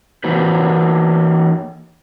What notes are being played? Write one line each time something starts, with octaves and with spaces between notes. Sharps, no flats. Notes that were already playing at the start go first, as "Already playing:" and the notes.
E3 A#3 F#4 B4 C5